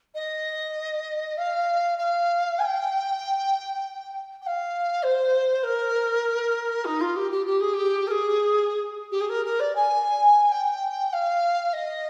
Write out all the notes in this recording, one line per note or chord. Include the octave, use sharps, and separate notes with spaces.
D#5
F5
F5
G#5
G5
G5
F5
C5
A#4
D#4
F4
G4
G4
G4
G#4
G4
A#4
G#4
G4
G#4
A#4
A#4
D5
G#5
G5
F5
D#5